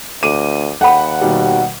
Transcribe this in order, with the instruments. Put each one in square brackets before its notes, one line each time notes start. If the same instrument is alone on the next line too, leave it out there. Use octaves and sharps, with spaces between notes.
[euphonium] D2 [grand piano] D6 [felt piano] D#7
[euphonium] D#2 [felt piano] F#5 [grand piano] G5 B5
[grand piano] B2 D#3 G3